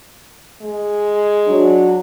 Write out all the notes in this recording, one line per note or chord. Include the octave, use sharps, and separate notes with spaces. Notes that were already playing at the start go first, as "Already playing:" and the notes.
G#3
F#3 D4